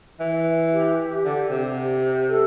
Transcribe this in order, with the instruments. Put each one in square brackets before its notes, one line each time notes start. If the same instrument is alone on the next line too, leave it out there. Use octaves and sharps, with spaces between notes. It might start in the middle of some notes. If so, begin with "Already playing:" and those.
[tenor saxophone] E3
[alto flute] G4
[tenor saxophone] D3
C3
[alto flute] A4